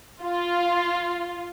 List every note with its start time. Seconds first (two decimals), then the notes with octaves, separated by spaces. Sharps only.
0.22 F4